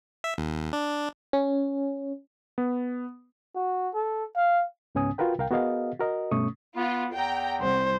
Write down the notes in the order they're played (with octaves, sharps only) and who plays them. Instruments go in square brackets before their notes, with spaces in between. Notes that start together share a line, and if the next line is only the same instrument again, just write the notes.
[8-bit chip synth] E5
D#2
D4
[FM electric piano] C#4
[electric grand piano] B3
[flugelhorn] F#4
A4
F5
[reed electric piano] C#2 G#2 B3 C#4 G#5 D#6
F4 F#4 A#4 B4 G5
C2 A#4 F5 G5
B3 F#4 G#4 A#4 D#5 F5
F#4 A#4 D#5
G2 B2 A3 C#4 C#6 D#6
[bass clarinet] B3 [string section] F4
[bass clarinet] E2 [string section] G5 A#5
[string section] C2 [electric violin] C5